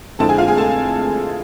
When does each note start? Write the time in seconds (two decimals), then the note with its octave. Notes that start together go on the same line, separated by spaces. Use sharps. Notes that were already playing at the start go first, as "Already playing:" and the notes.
0.19 F2 D3 G#3 C4 E4 A4 A5
0.29 G#4 G#5
0.38 F4 F5
0.48 G#4 G#5
0.57 A4 A5